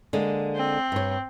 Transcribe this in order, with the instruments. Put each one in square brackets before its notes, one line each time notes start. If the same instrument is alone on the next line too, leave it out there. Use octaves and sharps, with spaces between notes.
[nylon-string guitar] D3 G#3 A#3
[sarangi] C4
[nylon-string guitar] G2 C#5